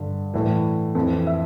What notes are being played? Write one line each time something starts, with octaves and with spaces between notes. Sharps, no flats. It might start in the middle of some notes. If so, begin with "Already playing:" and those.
Already playing: G2 D3
A2 E3
F2 E3
E5